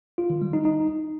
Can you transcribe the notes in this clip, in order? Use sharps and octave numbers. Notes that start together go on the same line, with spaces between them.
F4
D#3
G3
D#4
D#4